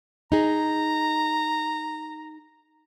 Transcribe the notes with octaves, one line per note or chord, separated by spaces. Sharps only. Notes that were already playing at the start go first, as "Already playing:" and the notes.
D#4 G#4 A#5